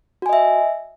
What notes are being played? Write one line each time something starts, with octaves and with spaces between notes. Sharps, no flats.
F#4 D#5 E5 G#5